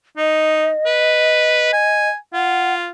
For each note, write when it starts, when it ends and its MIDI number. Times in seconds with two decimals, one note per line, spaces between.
0.17 0.71 63
0.17 2.09 75
0.86 1.71 71
1.73 2.16 80
2.33 2.90 65
2.33 2.74 78